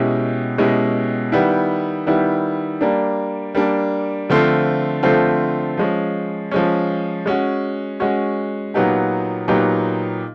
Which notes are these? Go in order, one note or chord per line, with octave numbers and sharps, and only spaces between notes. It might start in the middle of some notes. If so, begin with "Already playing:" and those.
Already playing: B2 G#3 C#4 E4 G4
B2 G#3 C#4 E4 G4
D#3 G3 B3 E4
D#3 G3 B3 E4
G3 A#3 D4
G3 A#3 D4
D3 F3 A3 C4 F4
D3 F3 A3 C4 F4
F3 G#3 C#4
F3 G#3 C#4
G#3 C#4 F#4
G#3 C#4 F#4
A#2 F#3 B3 D#4 G4
A#2 F#3 B3 D#4 G4